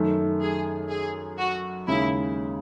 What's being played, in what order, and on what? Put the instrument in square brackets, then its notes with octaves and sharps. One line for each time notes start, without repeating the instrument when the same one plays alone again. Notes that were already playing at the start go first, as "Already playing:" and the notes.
Already playing: [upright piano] F#2 D#3 A3
[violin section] G#4
G#4
F#4
[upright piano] D#2 C#3 G#3 C#4 [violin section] E4